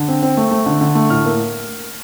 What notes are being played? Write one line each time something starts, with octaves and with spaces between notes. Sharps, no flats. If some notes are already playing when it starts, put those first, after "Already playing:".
Already playing: D3
C4
C4
A3
A3
D3
D3
A3
A2 F6
A#3